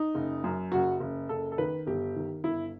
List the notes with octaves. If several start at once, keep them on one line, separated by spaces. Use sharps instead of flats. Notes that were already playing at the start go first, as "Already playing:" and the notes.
Already playing: D#4
F#1
F#2
F#1 F#4
F#1
F#1 A4
A4
D#3 B4
G1 G4
D#3
G1 E4